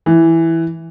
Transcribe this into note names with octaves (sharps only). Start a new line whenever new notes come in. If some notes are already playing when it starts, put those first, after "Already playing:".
E3